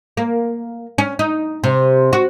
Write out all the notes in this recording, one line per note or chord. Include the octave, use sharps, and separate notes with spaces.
A#3
C#4
D#4
C3
F#4